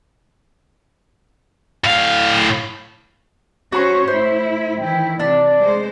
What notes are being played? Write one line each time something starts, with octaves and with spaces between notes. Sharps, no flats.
A2 F5
C#4 F#4 C5 C#5 B5 C#6
A2 E4 C5
D#3 E3 E4 G5
C3 D4 D5
G#3 C5